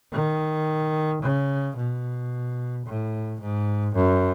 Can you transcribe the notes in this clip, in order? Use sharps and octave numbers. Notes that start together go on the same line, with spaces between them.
D#3
C#3
B2
A2
G#2
F#2